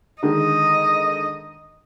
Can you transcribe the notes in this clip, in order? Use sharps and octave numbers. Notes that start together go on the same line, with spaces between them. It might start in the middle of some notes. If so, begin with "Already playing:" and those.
D3 D#3 G#3 D#5